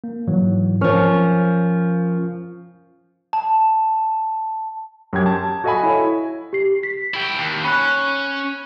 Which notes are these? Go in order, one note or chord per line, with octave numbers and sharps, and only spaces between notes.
A#3
G#2 E3 F#3
F3 C#4 A#4 C#6 F6
A5
F#2 F#3 C#4 G4 G5 G#6
A5
F#4 A4 D#5 F5 G#5 B5
E4 C#5
G4 C7
B6
E4 G5
D#2
C#4 B5 F#6